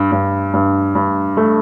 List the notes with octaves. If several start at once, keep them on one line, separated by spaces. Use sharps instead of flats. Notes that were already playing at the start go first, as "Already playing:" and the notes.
Already playing: G2
G2
G2
G2
A3